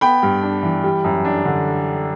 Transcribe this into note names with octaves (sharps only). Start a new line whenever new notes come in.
B3 G5 B5
G2
D4
E3
G3
F#2
D4
D3